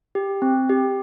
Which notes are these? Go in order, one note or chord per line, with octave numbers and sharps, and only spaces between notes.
G4
C4
G4